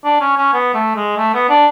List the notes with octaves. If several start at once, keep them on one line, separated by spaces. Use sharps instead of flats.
D4
C#4
C#4
B3
A3
G#3
A3
B3
D4